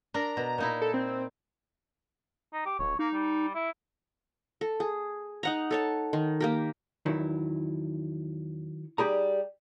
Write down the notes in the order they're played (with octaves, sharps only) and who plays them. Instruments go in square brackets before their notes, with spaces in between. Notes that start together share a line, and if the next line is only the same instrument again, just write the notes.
[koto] D4 A#4 [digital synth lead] A#5
[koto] B2
A#2 D#4 E4
[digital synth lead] A4
C4
[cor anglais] D#4
G4
[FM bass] D1 [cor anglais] C#5
[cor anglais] A#3 [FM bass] D#4
[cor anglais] G3
E4
[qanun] A4
G#4
D#4 F#5 A#5
A4 C#5 A5
D#3
A#3 G4 A#4
[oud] E2 [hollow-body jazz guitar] D#3 F#3 E4
[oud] G3 D#4 [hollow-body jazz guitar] G4 G#4 A#5